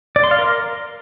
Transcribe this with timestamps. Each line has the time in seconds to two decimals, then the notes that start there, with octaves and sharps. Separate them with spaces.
0.16 D5
0.24 C6
0.31 F5
0.39 A#4